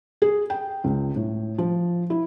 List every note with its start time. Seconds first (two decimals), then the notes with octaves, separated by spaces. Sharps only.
0.22 G#4
0.50 G5
0.84 C#2
1.16 A2
1.58 F3
2.10 E4